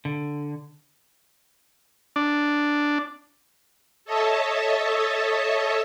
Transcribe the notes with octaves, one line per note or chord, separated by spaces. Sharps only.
D3
D4
A4 C#5 D#5 E5 A5